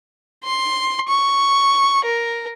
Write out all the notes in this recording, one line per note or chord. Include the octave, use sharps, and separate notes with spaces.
C6
C#6
A#4